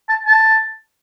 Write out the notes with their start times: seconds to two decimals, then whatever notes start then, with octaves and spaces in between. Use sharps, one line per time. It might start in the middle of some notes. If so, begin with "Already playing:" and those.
0.09 A5
0.26 A5